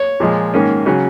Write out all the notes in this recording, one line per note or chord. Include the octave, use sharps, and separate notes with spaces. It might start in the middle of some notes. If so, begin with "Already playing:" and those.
Already playing: C#5
A#2 F3 G#3
G#2 D#3 A#3 C#4
C#3 F#3 C#4